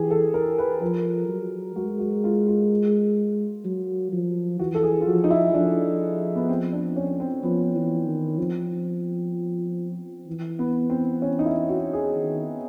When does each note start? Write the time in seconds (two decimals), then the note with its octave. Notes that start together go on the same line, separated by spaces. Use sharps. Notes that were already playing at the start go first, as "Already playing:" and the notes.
Already playing: E3 G4 G#4
0.11 A4
0.34 A#4
0.58 B4
0.81 F3 A#4
1.29 F#3
1.76 G#3 F#4
1.99 F#4
2.24 F4
2.47 F4
3.65 F#3
4.12 F3
4.59 E3 F#4
4.74 A4
4.83 G#4
5.01 F4
5.07 F3 F#4
5.24 D#4
5.30 E4
5.54 F3 D4
6.36 B3
6.49 C4
6.73 D4
6.96 C#4
7.20 C4
7.43 F3 B3
7.75 E3
8.06 D#3
8.38 F3 C4
10.27 E3
10.59 B3
10.90 C4
11.22 C#4
11.39 D#4
11.45 E4
11.69 F#4
11.93 G#4
12.16 D#3